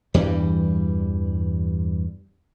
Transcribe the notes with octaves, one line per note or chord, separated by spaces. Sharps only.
E2 G2 E3 G3